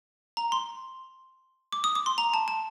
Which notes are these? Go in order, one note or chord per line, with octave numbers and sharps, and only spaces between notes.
A#5
C6
D6
D#6
D6
C6
A#5
A5
A5